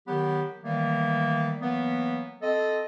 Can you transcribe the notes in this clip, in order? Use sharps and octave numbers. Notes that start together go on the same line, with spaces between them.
D#3 F#3 B3 G4
D#3 E3 G3 A3 A#3
E3 F#3 A#3 B3
C4 A4 D#5